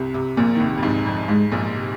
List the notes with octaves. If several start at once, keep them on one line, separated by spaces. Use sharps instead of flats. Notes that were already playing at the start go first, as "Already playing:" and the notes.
Already playing: C2 C3
C2 C3
A#1 A#2 A#3
D#3
C2 C3
F2
G#2
F2
G#2 G#3
A#1 A#2
C3